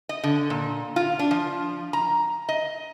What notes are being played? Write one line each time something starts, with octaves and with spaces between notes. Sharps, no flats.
D#5
D3
A#2
F4
D4
F3
A#5
D#5